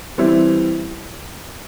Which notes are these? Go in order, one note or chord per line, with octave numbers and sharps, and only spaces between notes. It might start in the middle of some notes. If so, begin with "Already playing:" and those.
E3 G3 C4 E4